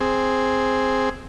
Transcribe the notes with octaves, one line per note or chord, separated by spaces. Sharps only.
C4 G#4